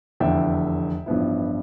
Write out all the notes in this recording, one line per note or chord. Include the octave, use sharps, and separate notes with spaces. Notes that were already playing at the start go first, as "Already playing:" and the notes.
F1 E2 D3 E5 G5
A1 G2 F3 B3 E4